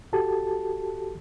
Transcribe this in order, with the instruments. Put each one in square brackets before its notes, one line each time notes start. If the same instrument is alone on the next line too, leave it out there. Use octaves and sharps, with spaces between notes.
[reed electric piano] F#4 G4 A4 A5